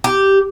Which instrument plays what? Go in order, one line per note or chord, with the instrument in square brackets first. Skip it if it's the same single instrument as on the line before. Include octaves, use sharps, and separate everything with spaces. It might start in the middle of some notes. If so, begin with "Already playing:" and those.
[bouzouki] G4